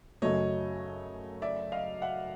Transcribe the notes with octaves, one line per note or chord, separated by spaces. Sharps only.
F#2 C#3 F#3 A3 C#5 D#5
D5 E5
D#5 F5
E5 F#5